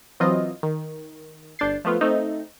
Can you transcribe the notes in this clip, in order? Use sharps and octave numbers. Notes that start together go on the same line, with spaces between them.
E3 F#3 C4 F4 D#5
D#3
G1 D4 G6 A6 C7
F3 A3 B3 F4
A3 C4 D#4